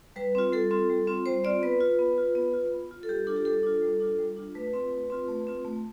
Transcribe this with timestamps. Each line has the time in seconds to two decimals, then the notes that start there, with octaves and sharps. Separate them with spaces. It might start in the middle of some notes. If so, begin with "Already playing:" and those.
0.16 G3 B4
0.35 C4 F4
0.53 G3 A4
0.71 C4 F4
0.90 G3
1.07 C4 F4
1.26 G3 C5
1.44 C4 F4 D5
1.62 B3 B4
1.81 F4
1.99 B3
2.18 F4
2.35 B3
2.53 F4
2.72 B3
2.91 F4
3.03 A4
3.08 G3 G4
3.27 D4 F4 A4
3.36 G4
3.45 G3 A4
3.63 D4 F4
3.82 G3
4.00 D4 F4
4.18 G3
4.37 D4 F4
4.55 A3 B4
4.74 C4 F4
4.91 A3
5.10 C4 F4
5.29 A3
5.47 C4 F4
5.65 A3